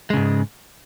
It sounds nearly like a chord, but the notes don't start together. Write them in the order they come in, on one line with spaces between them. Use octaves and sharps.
G#3 C#3 G#2